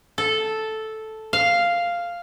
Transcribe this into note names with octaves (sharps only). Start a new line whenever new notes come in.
A4
F5